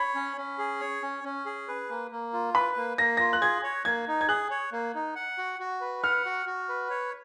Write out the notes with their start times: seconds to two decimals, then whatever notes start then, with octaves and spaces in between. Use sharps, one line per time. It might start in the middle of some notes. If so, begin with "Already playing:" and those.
Already playing: C#5 B5
0.15 C#4
0.37 C#4
0.58 G#4
0.80 C#5
1.02 C#4
1.24 C#4
1.46 G#4
1.68 B4
1.89 A#3
2.11 A#3
2.33 F4
2.55 B4 B5
2.76 A#3
2.98 A#3 A#6
3.17 F4 A#6
3.33 F#6
3.42 G#4 G#6
3.63 C#5
3.85 A#3 G#6
4.08 D#4
4.21 G#6
4.28 G#4 F#6
4.50 C#5
4.72 A#3
4.95 D#4
5.15 F#5
5.38 F#4
5.59 F#4
5.81 B4
6.03 F#5 F6
6.25 F#4
6.46 F#4
6.69 B4
6.90 C#5